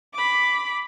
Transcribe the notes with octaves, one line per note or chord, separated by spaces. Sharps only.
B5 D6